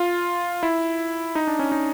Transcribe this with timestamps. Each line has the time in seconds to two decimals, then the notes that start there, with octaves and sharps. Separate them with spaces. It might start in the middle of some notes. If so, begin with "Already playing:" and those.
Already playing: F4
0.63 E4
1.35 D#4
1.47 D4
1.59 C#4
1.72 D#4